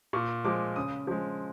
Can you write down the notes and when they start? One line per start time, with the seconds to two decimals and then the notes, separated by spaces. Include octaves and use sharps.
0.13 A#2 C#6
0.44 F3 G#3 D6
0.76 C#3 D#6
1.07 F3 G#3